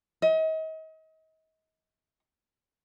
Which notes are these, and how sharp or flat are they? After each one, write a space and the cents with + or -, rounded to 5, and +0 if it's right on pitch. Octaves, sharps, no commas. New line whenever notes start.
D#5 +35